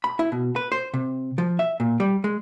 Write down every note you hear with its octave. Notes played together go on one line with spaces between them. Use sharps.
B5
E4
B2
B4
C5
C3
F3
E5
A#2
G3
G#3